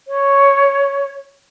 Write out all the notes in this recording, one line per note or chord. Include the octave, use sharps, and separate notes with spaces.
C#5